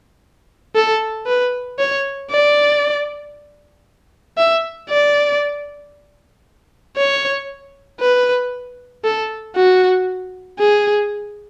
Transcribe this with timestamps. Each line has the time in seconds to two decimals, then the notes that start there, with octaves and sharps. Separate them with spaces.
0.75 A4
1.27 B4
1.79 C#5
2.31 D5
4.38 E5
4.89 D5
6.97 C#5
8.00 B4
9.04 A4
9.56 F#4
10.60 G#4